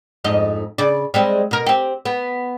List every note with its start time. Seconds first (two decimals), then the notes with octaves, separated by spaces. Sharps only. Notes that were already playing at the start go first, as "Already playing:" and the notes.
0.24 F2 G#2 D#5
0.78 C#3 D5
1.14 G3 G#3 C4
1.51 B2 A#4
1.67 C4 G4
2.05 B3